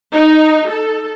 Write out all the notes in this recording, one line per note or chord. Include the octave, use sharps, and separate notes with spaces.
D#4
A4